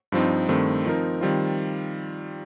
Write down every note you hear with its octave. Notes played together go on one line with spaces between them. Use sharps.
G2 F3 C4 D#4
G2 D#3 A3 C4
F3 C4 D#4 A#4
D#3 G3 C4 F4